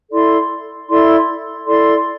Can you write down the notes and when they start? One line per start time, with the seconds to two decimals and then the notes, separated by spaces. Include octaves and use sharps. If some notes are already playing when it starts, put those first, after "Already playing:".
0.11 E4 A4 D5 C6
0.89 E4 A4 D5 C6
1.66 E4 A4 D5 C6